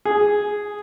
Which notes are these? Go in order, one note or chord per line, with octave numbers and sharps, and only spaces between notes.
G#4